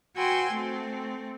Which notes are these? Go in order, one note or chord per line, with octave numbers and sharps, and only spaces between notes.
F#4 B4 G5 G#5 C6 E6
A3 C4